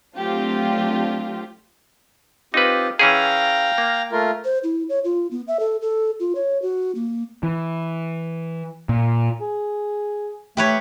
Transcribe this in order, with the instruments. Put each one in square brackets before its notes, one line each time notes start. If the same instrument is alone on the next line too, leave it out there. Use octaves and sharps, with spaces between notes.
[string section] F#3 A3 C4 D4 F4 G4
[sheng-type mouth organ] C4 F4 G4 [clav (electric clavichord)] D#4 B4
[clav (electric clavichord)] E3 C#4 G#4 [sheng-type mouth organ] F5 G5 A#5
[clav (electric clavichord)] A#3
[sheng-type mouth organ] A3 F4 A#4
[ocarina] C5
E4
C#5
F4
B3
E5
A4
A4
F4
C#5
F#4
A#3
[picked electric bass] E3
A#2
[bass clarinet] G#4
[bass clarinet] A3 [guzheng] G4 B4 C#5